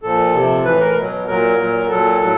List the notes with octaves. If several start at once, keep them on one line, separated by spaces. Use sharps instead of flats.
A#2 F3 A4
C3 F3
A2 E3 B4
A#4
B2 F#3
A#2 F#3 A#4
A#2 F#3
A#2 F#3 A4
A2 F#3